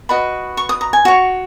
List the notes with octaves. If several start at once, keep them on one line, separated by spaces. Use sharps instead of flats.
F#4 B4 D#5 B5
C#6
D#6
A#5
G#5
F#4 C#5